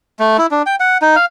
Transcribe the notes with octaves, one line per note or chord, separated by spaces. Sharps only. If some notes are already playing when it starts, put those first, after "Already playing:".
A3
E4
D4
G5
F#5
D#4
F5